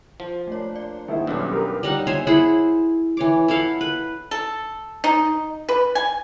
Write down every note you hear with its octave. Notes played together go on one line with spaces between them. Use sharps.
F3
A3 A#3 D4 C#5
D5
D#3 A#3 B3 E4 G#4 C5
B1 G2 C#4 F#4 G4 A4 C#5
G4 A#4 B4 F5
G3 D#4 F#5
C5 C#5 E5 G#5
E4 G#4 C5 F#5
E3 C#5 D6
E4 A4 F5 F#5
B4
A4
D#4
B4
G#5